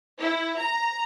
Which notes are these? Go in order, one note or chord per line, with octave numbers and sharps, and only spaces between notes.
E4
A#5